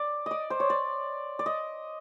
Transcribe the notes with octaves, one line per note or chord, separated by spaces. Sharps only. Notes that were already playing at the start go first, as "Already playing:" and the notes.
Already playing: D5
D5 D#5
C5
C#5
D5
D5
D#5